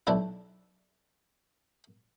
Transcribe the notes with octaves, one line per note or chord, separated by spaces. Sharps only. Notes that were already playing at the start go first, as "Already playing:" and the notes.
B1 D4 E4